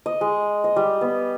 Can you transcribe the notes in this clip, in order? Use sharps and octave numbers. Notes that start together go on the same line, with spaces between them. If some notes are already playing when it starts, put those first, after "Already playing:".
D#5
G#3
D#5
G3
B3